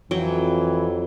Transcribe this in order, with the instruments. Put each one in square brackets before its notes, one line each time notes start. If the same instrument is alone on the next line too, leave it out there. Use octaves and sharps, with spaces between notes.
[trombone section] F2 [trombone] E3 [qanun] F#3 G5